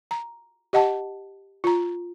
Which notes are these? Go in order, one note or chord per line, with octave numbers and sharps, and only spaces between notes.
A#5
G4 D#5 F#5 A5
F4 A#5